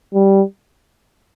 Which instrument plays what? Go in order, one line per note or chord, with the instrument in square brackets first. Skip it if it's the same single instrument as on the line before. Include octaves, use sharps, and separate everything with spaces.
[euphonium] G3